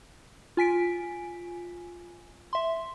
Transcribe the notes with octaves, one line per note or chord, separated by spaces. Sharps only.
F4 G#5 B6 D7
E5 C6